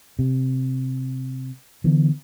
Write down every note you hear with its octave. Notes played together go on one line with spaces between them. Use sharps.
C3
D3 E3 B3